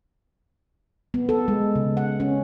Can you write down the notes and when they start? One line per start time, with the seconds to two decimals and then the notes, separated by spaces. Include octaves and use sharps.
1.14 B3
1.29 A4
1.48 G#3
1.76 C#3
1.97 F#5
2.20 C#4